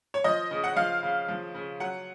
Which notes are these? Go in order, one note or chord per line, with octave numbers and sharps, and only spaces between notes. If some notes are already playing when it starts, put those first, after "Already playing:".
C#5
F3 D#5
C#3
F#5
F3 F5
C#3
F3
C#3
F#3 F#5